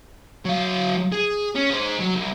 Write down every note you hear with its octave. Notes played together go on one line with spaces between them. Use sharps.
F#3 F5
G#4
C#4
G#4 C5
F#3
C2